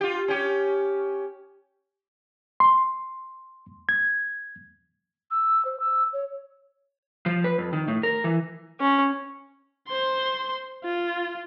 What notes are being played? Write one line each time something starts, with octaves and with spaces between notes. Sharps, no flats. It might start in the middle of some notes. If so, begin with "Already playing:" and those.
F4 G4
C#4 G4
C6
G#6
E6
C5
E6
C#5
F3
B4
F2
D#3
A2
A#4
E3
C#4
C5 C6
F4